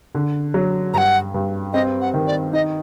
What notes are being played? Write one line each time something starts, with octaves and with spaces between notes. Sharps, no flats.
D3
F#3
G2 F#5 A#5
G2
C4 D#5
F#5
D#3
D5
D#4 D#5